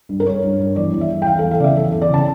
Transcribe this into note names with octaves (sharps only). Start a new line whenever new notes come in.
G2
A#4
G2 C#5
G2
G2
E2 D5
E2
E5
E2
G5
E3 F5
E2 A4
F5
C#3 D5 E5
E2 A4
E2
D5
C#3 A5